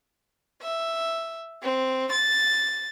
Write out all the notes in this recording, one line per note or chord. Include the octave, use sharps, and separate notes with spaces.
E5
C4
A6